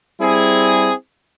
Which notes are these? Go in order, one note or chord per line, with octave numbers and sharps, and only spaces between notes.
G3 C4 E4 G#4